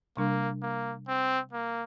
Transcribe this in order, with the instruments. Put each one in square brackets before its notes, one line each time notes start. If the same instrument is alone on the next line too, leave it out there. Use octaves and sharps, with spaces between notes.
[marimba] C3 G3 D4 [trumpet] A#3
[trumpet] A#3
C4
A#3